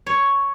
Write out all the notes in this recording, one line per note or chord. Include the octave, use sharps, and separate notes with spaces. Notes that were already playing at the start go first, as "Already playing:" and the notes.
C#5